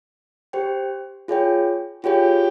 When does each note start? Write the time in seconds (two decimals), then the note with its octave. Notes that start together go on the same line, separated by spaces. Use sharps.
0.53 G4 C5 G5
1.28 F4 G#4 C#5 G5
2.04 F4 G4 G#4 C#5 G5